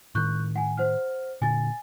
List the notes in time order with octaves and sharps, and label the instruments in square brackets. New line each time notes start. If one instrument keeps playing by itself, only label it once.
[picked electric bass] A2 D#3 [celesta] C#6 F#6 G6
[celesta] F#5 G#5
C5 F#5 F6
[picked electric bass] A#2 D3 [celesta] G#5 A6